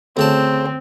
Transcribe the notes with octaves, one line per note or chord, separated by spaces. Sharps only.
D2 C#3 C4 A5